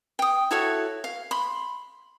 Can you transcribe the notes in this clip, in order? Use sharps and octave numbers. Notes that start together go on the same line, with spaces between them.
G5 D#6
E4 F#4 A4 C#5
F5
B5 C6